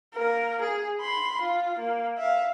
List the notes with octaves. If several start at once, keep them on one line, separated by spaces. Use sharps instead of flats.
A#3 A#4
G#4
B5 C6
F4
A#3
E5 F5